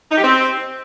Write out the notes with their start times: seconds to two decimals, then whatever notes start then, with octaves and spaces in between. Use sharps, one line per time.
0.11 D#4
0.18 G4
0.24 C4